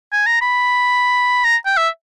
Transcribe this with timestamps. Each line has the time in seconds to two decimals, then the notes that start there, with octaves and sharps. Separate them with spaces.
0.12 G#5
0.27 A#5
0.41 B5
1.44 A#5
1.66 G5
1.77 E5